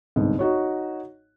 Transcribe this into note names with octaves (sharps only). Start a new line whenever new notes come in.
G1 C2 G#2
D#4 F#4 C#5